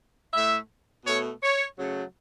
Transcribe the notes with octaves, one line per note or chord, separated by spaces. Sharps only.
A2 A3 E5
B2 A3 C#5
C#5
C#3 F#3 A3